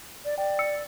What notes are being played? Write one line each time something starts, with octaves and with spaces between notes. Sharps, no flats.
D5
D5 G5
E6 C#7